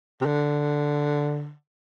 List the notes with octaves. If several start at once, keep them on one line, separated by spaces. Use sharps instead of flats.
C3
D3